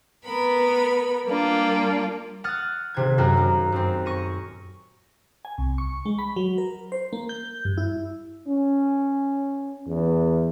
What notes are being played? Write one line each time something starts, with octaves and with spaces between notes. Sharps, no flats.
B3 A#4 B5
G3 A#3 D4 F4
F#5 D#6 F6 F#6 A6
D#1 C3 G#6
F#2 F#4 A#4 G5
F#2
F#2 C4
C#6 A#6 D#7
G#5
C2
C#6
G#3
B5
F#3
A#4
C5
A#3
G6
G2
E4
C#4
E2